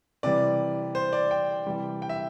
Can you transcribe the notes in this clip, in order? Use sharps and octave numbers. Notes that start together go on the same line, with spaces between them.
C3 E3 G3 D5
C5
D5
G5
C3 E3 G3
G5
E5